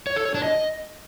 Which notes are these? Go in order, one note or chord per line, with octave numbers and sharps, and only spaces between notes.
C#5
A4
C#5
D4
D#5